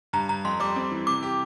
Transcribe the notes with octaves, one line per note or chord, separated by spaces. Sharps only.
G2 A#5
G2 A#5
F2 C6
G3 D6
C4
E3
C3 D6
G4